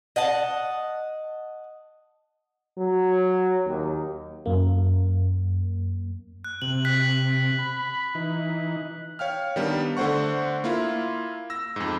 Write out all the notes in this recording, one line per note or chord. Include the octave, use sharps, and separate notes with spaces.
D#5 F#5 A5
F#3
D#2
F#2 A#3
F#6
C3 F#7
F#6 B6 F#7
B5
E3 D#4
C#5 F5 G5 F6
D#3 G3 B3 D4
D3 A3 C5 F#5 C#6
A#3 E4 F4
E6 A#6
F2 G#2